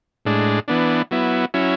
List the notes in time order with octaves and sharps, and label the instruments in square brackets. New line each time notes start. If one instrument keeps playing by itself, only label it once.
[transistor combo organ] A2 G#3 D4
E3 B3 D4
F#3 B3 E4
F#3 C#4 E4